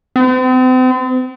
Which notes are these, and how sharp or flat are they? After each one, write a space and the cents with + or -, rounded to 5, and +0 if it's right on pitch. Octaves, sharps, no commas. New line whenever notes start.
C4 -40